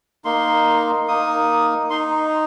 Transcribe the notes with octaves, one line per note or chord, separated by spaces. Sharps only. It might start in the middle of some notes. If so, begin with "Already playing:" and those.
A#3 D#4 C6
A#3 D#4 D#6
D#4 C6